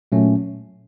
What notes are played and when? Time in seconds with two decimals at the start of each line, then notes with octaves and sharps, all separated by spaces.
0.12 A#2 F#3 A3 C#4